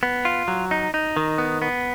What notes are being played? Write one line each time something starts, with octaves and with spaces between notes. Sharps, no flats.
B3
F4
F#3
D#4
D#4
D#3
B3
B3